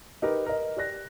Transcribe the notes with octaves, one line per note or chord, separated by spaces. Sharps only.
D#4 G4 A#4 B4
A#4 D#5
G4 D5 F#6 A#6